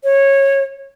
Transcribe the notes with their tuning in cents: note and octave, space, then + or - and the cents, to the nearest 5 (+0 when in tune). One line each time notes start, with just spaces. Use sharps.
C#5 -15